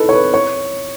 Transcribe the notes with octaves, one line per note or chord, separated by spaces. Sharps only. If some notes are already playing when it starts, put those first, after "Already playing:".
Already playing: D#4 E4 A4 B4
C#5
B4
C#5